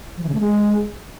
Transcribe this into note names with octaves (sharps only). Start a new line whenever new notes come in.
F3
E3
C#3
A3
G#3